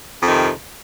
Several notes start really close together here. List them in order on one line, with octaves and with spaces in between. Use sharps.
F2 D#3 C3